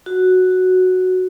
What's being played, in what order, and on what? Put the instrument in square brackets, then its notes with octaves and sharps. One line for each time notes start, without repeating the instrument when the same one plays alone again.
[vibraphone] F#4